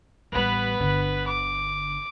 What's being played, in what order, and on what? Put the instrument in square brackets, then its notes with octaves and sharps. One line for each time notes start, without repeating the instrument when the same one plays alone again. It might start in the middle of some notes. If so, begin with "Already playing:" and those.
[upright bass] A1 G3 [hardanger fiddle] B3 B4
[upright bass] G1 D3
[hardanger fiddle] D6